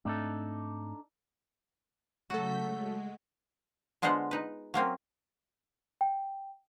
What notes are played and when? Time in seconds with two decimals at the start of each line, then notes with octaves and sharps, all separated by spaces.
0.05 G#2 A3 C4 D4 D#4 A4
2.30 C#3 F#3 A3 F#4 A4 G6 B6
2.60 G#3
4.02 D3 G#3 B3 F4 C5 F#5
4.31 D#4 B4
4.74 F#3 A#3 C4 C#4
6.01 G5